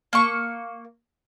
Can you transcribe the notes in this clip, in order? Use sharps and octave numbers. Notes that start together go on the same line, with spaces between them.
A#3 C#6